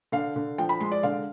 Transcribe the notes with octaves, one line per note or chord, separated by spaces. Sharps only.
D3 F5
D3
F3 G5
B5
G#3 C6
D5
D3 F5